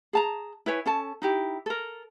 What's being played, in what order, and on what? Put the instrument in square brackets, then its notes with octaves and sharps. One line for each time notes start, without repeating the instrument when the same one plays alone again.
[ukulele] G#4 A5 A#5
E4 B4 C#5 G#5
C#4 A4 A5
D#4 E4 G4
A4 A#4